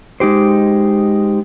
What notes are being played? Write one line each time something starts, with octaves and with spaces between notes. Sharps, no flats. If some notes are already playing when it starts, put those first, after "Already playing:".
G#3 D#4 G4 C5